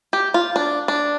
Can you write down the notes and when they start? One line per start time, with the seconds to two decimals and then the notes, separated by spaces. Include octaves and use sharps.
0.13 G4
0.34 F4
0.56 D4
0.88 D4